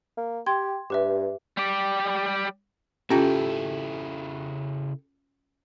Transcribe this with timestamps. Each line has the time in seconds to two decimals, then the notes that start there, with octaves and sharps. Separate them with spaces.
0.17 A#3
0.46 G4 G5 C6 G#6
0.90 G2 G4 B4 E5
1.57 G3 G4
3.10 C#3 C#4 E4 F4 G4 A4